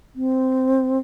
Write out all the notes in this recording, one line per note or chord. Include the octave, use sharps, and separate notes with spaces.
C4